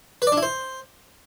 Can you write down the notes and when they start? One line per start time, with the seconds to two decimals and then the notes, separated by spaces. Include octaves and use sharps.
0.22 B4
0.27 D5
0.32 D4
0.37 E4
0.43 C5